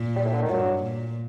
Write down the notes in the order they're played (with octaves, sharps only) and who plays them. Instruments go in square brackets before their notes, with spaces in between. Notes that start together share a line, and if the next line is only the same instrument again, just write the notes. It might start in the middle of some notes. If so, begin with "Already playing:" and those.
Already playing: [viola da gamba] A#2
[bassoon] G3
A2
D3
D#3
[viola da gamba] G2 [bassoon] F#3
[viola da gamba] A#2